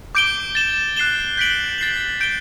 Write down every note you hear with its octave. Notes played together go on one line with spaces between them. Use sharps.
D6 G6 D7 G7
A6 E7 G7
F#6 C7 E7 G7
G6 B6 D7 F#7
A6 C7 F#7
G6 D7 G7